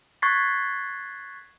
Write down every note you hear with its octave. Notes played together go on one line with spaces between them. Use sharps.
C#6 F#6 G#6 A6 B6 C7